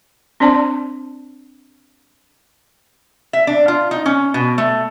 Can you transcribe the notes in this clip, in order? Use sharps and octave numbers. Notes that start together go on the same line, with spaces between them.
C4 D4 C5 D5 A5
E5
D4
F4
D#4
C#4
B2
A3